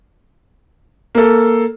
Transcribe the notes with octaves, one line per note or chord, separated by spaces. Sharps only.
A#3 A4